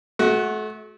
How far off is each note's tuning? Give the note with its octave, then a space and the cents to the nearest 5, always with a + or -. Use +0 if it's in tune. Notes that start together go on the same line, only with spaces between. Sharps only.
A3 -35 F#4 +0